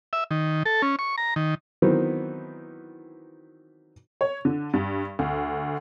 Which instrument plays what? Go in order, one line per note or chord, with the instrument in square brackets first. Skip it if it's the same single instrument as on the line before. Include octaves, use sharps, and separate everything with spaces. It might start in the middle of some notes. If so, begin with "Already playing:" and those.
[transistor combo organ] E5
D#3
A4
C#4
C#6
A#5
D#3
[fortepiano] D#3 E3 F#3 B3 C4
[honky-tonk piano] C#5
D3
G2
D2